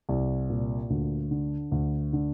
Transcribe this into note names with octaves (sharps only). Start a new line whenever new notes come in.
C2
A#2
D2
D3
D2
D3